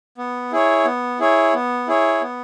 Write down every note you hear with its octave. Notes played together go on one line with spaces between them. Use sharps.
B3
E4 G#4 C#5
B3
E4 G#4 C#5
B3
E4 G#4 C#5
B3